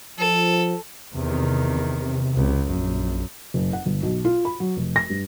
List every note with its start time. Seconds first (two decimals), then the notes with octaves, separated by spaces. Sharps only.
0.19 F3 A4
1.15 E2 C3 D#3
2.35 C#2
2.70 A#1 F#2
3.54 F#1
3.73 F#5
3.86 G1
4.03 B1
4.25 F4
4.45 B5
4.60 F#3
4.77 F1
4.96 A#6
5.10 G2